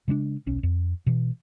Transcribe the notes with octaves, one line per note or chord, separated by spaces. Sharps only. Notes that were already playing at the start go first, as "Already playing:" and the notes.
C#3 G#3 A#3 D4
D#1 B1 C#4
F2
B2 E3